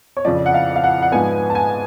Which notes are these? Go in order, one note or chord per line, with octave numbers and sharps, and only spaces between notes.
C#5
F2 C#3 F3 D5
F#5
F5
F5
F#5
F#5
G#2 F3 B3 G#5
A5
G#5